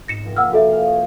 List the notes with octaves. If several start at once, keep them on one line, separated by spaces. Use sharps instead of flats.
G#2 B3 A#6 C#7 E7
F1 F4 G5
G3 A#3 F#5 E6 F6
F#4 A4 E5
F5 G#5 F6
C#5 D#6 G6